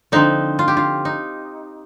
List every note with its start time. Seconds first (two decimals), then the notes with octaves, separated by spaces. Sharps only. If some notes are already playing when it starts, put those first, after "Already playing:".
0.12 D3 F3 C4 D#4
0.59 F4
0.68 G4
0.77 F4
1.05 D#4